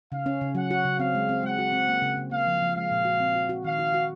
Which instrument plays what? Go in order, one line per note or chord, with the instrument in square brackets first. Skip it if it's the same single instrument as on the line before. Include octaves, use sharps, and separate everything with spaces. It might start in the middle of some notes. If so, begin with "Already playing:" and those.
[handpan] C#3 [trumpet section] F5
[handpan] C#4
C#3
[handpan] F#3 [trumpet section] F#5
[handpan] F#4
C#3
[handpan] C4 [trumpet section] F5
[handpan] G#3
C4
[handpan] G#3 [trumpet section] F#5
[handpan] F#4
C4
A#3
C#3
C#3
[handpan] A#3 [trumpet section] F5
[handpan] F3
F3
[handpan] G#3 [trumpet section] F5
[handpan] A#2
F#4
C4
F#4
F#4
[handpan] D#3 [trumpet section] F5
[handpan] F#4
F#4